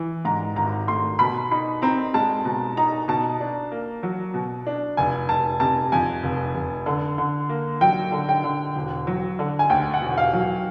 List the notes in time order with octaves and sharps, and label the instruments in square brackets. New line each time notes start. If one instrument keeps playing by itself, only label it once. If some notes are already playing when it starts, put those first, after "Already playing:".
Already playing: [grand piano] E3
[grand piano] G#2 [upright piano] A#5
[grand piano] G#1 [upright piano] A#5
[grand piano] A3 [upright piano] C6
[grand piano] B2 [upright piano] B5
[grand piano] D#4 [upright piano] B5
[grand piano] C4 [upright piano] A#5
[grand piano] G#3 [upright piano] A5
[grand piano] B2
[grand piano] D#4 [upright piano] A#5
[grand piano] B2 [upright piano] A5
[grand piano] D4
A#3
F#3
B2
D4
[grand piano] F1 [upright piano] G#5
[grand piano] F1 [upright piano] A5
[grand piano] C3 [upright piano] A5
[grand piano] F2 [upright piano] G#5
[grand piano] F1
F1
D3
D3
A#3
[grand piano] F#3 [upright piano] G5
[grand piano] D3
[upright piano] G5
[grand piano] D3
E1
F#3
D3
[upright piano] G#5
[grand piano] D2 [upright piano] G5
[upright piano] F#5
[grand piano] E1
[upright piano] F5
[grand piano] F#3